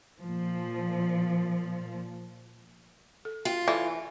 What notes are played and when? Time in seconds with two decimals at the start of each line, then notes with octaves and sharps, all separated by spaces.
0.22 A#2 F3
3.25 A4
3.45 F4 G5
3.68 E3 A4 D5